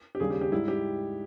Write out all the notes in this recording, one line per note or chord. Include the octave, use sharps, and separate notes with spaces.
G4
D#2 C#3 G3 G#4
G4
G4
G#2 G3 E4
G4